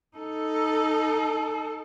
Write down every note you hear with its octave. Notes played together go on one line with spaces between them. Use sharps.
D#4 A4